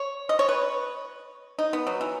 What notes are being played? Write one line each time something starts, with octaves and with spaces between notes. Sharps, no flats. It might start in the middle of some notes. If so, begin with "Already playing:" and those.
Already playing: C#5
D#5
C#5
B4
D#4
B3
F#3
E3